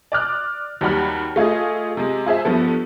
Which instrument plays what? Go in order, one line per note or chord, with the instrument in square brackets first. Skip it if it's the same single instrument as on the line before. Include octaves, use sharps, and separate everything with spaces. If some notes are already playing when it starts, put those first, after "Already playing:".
[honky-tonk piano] D5 D6 F6 F#6
D#2 F#3 G3 F#5 B5 F6
A3 F4 G#4 D#5
C3 G#3
F4 G#4 C5 E5
G2 F3 B3 A4